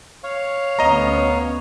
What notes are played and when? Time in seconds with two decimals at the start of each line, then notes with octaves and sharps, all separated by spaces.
0.23 C#5 F5
0.79 D2 B3 C#4 D#5 A#5